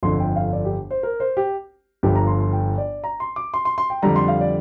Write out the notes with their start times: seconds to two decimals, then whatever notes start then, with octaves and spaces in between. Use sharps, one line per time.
0.03 G1 F2 D3 C6
0.20 G5
0.36 F5
0.53 D5
0.65 G4
0.91 C5
1.03 A#4
1.20 C5
1.37 G4
2.03 G1 G2 F3 G4
2.15 A#5
2.27 C6
2.41 C6
2.53 G5
2.78 D5
3.04 A#5
3.20 C6
3.36 D6
3.54 C6
3.65 C6
3.78 C6
3.90 G5
4.02 F2 D3 G3 A#5
4.16 C6
4.28 F5
4.41 D5